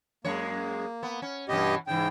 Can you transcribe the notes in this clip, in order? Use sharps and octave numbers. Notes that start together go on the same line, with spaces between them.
F#2 G#3 A#3 C#5
B3
C#4
G2 B2 E3 C#4 G4 D#5
G#2 C#3 E3 G5